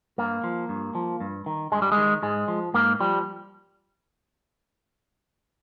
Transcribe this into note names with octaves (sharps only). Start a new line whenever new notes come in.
G2 A#3
F3
G2
F3
G2
D#3
G2 G#3
G3
G#3
D#3
G#2 G#3
F3
G#2 A#3
F3 G3